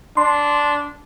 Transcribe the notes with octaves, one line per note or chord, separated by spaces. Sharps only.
D4 C6